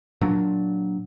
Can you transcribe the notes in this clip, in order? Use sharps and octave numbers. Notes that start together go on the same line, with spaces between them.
A#2 F#3 D4